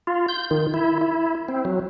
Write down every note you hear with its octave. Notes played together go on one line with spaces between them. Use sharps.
F4
G6
D#3
E4
E4
C4
F#3